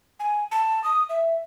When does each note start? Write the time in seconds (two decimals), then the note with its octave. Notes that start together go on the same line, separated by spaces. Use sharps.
0.20 G#5
0.52 A5
0.84 D#6
1.09 E5